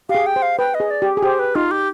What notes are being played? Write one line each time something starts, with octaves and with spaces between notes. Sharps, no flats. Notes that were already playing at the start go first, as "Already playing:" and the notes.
G4 F5
G#4
G5
C5
F5
B4 G5
D#5
G#4
D5
G4
G#4
G4 C5
B4
D#4 F4
G4